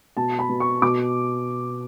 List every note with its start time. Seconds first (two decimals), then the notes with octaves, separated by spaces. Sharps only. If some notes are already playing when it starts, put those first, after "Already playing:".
0.17 B2 A5
0.39 B5
0.49 B2
0.60 C#6
0.82 B2 D6